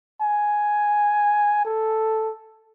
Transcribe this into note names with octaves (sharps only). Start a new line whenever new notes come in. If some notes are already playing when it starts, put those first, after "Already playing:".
G#5
A4